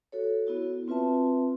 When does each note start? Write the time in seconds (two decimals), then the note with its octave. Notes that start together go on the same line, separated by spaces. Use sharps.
0.12 F#4 A4 C#5
0.47 B3 E4 F#4
0.88 C4 F4 B4 E5 A5